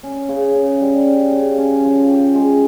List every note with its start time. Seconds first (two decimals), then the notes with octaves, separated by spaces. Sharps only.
0.03 C#4
0.29 C#3
0.55 C#3
0.81 G3
1.06 C#4
1.32 C#3
1.58 C#4
1.84 F3
2.09 G4
2.35 G#3